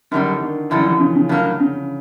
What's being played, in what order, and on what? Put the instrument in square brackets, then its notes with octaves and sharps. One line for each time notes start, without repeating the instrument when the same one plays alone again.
[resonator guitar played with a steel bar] F#2 D3 G3 [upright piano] D#3
[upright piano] D3
D#3
[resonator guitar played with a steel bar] F#2 D3 G3 [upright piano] E3
[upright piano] F3
C#3
C#3
[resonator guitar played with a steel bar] A2 F#3 A#3 [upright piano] D3
[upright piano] C#3